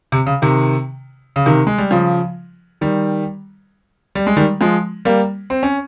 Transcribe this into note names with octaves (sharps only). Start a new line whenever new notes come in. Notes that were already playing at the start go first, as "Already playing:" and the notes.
C3
C#3
C3 D#3
C#3
C3 D#3
G#3
G3
C#3 F3
D#3 G3
G3
G#3
D#3 G3
F3 G#3
G3 A#3
C4
C#4